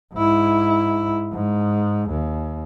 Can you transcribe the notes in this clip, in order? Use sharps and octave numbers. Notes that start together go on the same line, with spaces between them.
G#2 E4
G#2
D#2